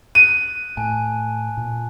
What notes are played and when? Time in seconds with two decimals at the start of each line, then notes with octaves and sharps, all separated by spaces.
0.15 F#6 D#7
0.77 A2 G#5 A5 F#6
1.57 A#2